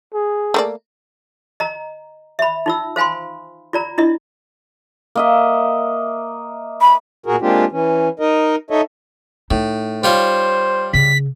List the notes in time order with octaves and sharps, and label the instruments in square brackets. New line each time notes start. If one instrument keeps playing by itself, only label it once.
[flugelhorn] G#4
[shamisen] A3 A#3 D5
[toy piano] D#5 A#5
E5 B5
D#4 F4 E6
C5 F5 G#5 B5 C6
F4 D5 A#5
D4 E4 F4 D#5
[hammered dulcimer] A#3 D#5 E5
[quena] B5
[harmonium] A#2 F#4 G#4 A#4
G#3 A#3 C4 D4 F4 G4
E3 C#4
D#4 A#4 D#5
D#4 A4 C#5 D#5 E5
[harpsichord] A2 [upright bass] D#4
[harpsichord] G3 F4 C#5 [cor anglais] C5
[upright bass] C#3 [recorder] B6